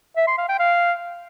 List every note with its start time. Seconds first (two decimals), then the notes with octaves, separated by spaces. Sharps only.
0.17 E5
0.27 C6
0.38 F5
0.49 G5
0.59 F5